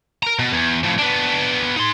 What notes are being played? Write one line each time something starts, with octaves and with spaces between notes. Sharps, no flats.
A#4 A#5
B2
E2
F2 A2
B3 D4
D#4 C6